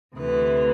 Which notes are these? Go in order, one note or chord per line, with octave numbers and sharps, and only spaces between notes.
D2 C3 E3 B4